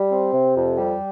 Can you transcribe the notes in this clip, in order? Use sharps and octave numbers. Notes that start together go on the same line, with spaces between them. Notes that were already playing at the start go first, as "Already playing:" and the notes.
Already playing: G3
C4
C3
F2
G3